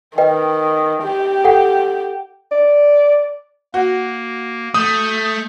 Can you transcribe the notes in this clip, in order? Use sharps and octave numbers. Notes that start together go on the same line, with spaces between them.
D#3 B4 D#5 G5
G4
A4 F#5 G5
D5
A#3 F#4
A3 D#6 G6